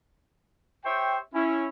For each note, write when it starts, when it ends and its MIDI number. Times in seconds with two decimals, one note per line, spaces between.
0.85 1.17 67
0.85 1.17 72
0.85 1.17 73
0.85 1.17 76
0.85 1.17 79
1.34 1.68 61
1.34 1.68 64